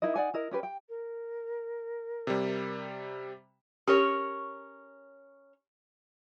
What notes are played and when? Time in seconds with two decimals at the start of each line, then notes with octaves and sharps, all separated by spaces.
0.02 D#4 E4 A#4 D#5
0.16 D#4 D5 F#5 G#5
0.34 E4 A#4 D#5
0.51 C#4 G4 B4
0.63 G5
0.89 A#4
2.27 C3 G3
3.88 C#4 G4 A#4 C#5